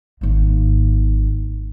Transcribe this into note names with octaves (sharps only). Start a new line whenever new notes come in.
G#1 A#3